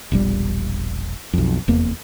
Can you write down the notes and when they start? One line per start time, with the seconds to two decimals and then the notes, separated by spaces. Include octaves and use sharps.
0.12 E1 A#1 G3
1.33 B1 F2
1.68 F1 E2 A#3